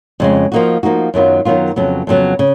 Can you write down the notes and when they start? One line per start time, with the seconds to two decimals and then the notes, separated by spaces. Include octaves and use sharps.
0.20 F2 C#3 G#3
0.52 F3 A#3 D#4 F#4
0.83 F3 A#3 D#4 F#4
1.14 F#2 D#3 F#3 B3 F4
1.45 F#2 D#3 F#3 B3 F4
1.76 F2 C#3 F#3 B3
2.07 F2 C#3 F#3 B3
2.39 C#3